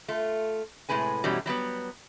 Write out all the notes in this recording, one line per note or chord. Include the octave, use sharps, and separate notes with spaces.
A3 F4
A2 C3 G#3 B4 G#5
F#2 B2 E3 F#3 G3
F#3 G3 A#3 B3